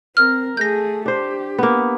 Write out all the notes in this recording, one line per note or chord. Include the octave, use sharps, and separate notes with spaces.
C4 A#4 F6
A3 G#4 G6 A#6
D4 G4 C5
A#3 B3